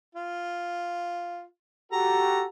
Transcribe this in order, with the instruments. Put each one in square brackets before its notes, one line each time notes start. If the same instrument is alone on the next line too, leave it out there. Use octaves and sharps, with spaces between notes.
[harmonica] F4
[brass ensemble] F#4 G4 A4 [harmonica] A#5